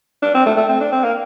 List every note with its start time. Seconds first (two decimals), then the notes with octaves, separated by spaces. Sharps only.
0.22 D4
0.35 C4
0.46 A3
0.57 A3
0.69 C4
0.81 D4
0.92 C4
1.04 A#3